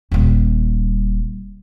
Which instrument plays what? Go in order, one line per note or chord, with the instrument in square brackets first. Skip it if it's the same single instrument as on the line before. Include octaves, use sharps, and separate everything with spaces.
[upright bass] D#1 G3